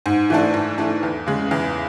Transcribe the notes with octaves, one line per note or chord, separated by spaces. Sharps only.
G#2
E3 A3 D4
G#2
E3 A3 D4
E2
C#3 G#3
E2